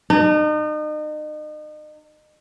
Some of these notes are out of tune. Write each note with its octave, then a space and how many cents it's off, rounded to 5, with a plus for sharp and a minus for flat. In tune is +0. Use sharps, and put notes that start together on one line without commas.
D#4 -35